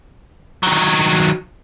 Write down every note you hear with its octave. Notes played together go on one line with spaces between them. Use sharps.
D#3 F#3